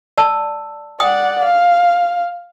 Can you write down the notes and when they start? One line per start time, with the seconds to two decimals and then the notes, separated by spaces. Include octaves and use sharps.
0.18 D5 A5 E6
1.00 D5 F#5 G5 D#6
1.45 F5